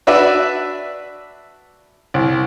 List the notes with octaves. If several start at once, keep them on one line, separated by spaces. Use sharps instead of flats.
D4 F#4 B4 D5 E5
C2